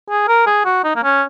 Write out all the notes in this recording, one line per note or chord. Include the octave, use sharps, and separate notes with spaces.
G#4
A#4
G#4
F#4
D#4
A#3
C#4